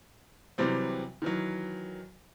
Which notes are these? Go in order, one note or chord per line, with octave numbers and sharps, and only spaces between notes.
C3 E3 F#3 G3 C4
D#3 E3 F#3